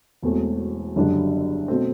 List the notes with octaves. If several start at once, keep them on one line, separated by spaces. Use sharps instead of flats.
E1 E2 B2 A3 C4
F#1 F#2 D3 G3 D4
B2 A3 C4